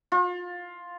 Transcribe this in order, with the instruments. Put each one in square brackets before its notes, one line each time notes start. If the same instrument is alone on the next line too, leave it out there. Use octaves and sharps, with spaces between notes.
[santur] F4